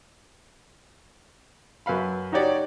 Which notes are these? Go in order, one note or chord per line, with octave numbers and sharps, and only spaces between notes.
F#2 B4 F5 B5
D#4 F#4 G4 C#5 D5